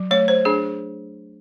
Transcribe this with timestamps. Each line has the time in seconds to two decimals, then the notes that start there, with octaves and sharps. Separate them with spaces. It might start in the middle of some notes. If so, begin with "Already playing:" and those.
Already playing: F#3
0.11 A3 C#5
0.28 C5
0.45 D4 G#4